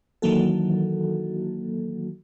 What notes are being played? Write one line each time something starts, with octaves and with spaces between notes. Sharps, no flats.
D#3 E3 F#3 A#3 F#4 A4